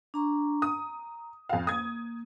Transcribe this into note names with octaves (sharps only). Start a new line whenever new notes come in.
D4 A#5 C#6
A#5 D#6
F2 F5
A#3 D#6 G#6